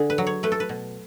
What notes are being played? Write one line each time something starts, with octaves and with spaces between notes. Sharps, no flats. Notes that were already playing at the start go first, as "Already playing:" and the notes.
Already playing: D3 G#4
B4
F#3
C#5
A3 B4
A4
B4
B2